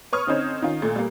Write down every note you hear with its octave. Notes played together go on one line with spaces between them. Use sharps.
B4 C#5 C#6 D#6 F6
D3 C4 C#4 D#4 C5 C#5
D#3 C#4 F4
A#2 A3
G3 A#3